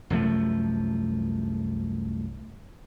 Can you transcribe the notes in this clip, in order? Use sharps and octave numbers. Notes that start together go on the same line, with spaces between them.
C2 F#2 F3 A3